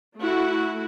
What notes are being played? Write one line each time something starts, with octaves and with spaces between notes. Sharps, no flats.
A3 E4 F#4